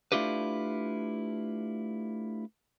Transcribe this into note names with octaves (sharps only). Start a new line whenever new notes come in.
A3 D4 E4 F4 G4 B4